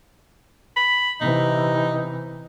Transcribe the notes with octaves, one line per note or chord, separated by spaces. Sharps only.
B5
C3 E3 D#4